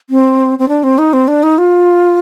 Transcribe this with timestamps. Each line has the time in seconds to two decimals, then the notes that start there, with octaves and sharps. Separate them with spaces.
0.10 C4
0.59 C4
0.68 D4
0.84 C4
0.98 D#4
1.13 C4
1.28 D4
1.43 D#4
1.58 F4